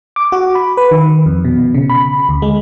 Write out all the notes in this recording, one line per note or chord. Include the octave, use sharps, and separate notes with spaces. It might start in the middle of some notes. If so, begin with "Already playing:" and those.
D6
F#4
B5
B4
D#3
F2
B2
C#3
B5
D2
G#3